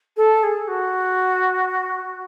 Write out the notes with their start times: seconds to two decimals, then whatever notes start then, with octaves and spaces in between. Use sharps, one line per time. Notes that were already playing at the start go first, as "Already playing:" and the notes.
0.16 A4
0.43 G#4
0.67 F#4